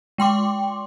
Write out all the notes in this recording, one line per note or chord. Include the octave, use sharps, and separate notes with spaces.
G#3 G5 C6 D6